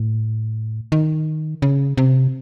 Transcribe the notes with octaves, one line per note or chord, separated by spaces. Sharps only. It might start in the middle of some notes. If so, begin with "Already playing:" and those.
Already playing: A2
D#3
C#3
C3